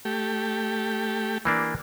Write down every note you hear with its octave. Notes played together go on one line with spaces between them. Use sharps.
A3 G4
E3 A#3 D4